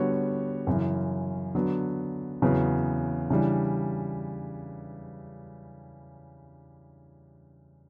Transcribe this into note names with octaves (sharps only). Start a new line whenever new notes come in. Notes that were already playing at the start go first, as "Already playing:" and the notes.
Already playing: D3 G3 B3 F#4 C#5
F#2 C#3 E3
D3 F#3 B3
E2 C#3 F#3 B3
C#3 E3 G3 D4